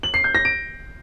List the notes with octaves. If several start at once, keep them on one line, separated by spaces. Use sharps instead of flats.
F#7
C7
G6
A#6
D7